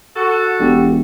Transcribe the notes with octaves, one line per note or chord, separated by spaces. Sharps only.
F#4 A4
E1 D4 G4